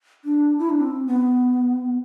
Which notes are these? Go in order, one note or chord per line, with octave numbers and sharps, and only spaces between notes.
D4
E4
D4
C4
B3